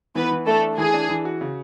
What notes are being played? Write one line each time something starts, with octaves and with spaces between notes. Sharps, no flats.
E3 B3 B4
E3
A3 D4 A4
D4
E3 G#4
D4
E3
F#4
C#3